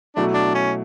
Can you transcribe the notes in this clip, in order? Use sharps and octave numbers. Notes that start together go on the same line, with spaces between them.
B2 F#3 A3 D4 E4
D4
C#4